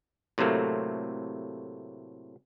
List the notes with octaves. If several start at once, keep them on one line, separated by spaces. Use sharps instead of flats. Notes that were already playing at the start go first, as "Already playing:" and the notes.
A2 C3 F#3 A3 A#3